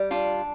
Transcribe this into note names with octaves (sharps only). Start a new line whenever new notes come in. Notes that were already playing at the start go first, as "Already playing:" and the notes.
Already playing: G3
D4 F4